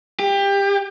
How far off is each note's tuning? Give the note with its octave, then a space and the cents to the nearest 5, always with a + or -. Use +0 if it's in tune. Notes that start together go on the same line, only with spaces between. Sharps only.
G4 +20